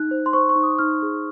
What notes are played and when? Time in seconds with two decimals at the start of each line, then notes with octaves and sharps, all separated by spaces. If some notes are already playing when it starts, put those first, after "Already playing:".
Already playing: D#4 F#6
0.11 C5
0.26 C6
0.33 C5 C#6
0.49 C#6
0.56 D#4
0.63 D#6
0.79 D#4 F6
1.02 G#4